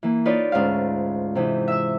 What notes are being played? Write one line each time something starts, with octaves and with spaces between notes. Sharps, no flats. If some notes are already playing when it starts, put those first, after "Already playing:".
E3 A#3
D#4 F4 B4 C#5 D5
D2 G#2 C#4 F4 F5
C3 E3 D#4
E5 E6